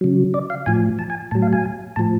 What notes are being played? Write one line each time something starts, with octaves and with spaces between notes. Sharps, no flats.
C#3 F#3
D5
F5
A2 F3 G#5
A5
G#5
A2 F#3 A5
F5
G#5
A2 F3 A5